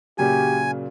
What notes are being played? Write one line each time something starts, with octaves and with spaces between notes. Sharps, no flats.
A#2 C#3 F#3 G4 G#5